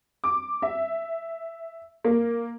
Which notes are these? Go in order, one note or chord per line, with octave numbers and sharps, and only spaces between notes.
D6
E5
A#3